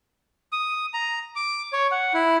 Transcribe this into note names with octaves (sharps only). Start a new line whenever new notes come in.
D#6
A#5
D6
C#5
F#5
E4